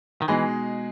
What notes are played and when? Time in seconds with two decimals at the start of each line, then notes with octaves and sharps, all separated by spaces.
0.22 D#3
0.28 B2 E3 G#3 D#4 G#4